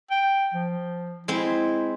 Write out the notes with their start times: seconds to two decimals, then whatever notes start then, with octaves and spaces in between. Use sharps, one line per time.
0.11 G5
0.54 F3
1.28 G#3 C4 E4